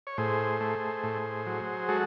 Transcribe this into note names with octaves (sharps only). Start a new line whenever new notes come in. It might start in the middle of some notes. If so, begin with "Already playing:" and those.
C#5
A2 G#4 C5
A3
A2
F#3
G#3 F#4 A4